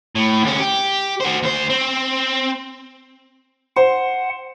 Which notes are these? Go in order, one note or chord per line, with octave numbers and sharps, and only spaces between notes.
A2
D2 C#4
G4
F#4 C5
D2 C5
C4
C5 F#5